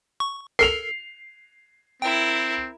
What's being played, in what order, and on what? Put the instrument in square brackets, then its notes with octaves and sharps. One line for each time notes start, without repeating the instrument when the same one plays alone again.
[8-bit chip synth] C#6
[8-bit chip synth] A4 A#4 [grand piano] C7 F7
[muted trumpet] C4 [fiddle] E4 A#4 [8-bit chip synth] G5